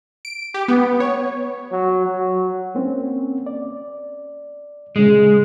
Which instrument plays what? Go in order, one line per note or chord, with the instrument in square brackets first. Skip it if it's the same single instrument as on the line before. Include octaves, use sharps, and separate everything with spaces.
[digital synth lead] D7
G4
B3
C#5
[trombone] F#3
F#3
[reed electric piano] A#3 C4 C#4
D5
[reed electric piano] A#2 C#3 [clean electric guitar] G#3